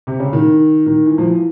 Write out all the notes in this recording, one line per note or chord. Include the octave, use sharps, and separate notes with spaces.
C3
C#3
D#3
D#3
E3
F3
E3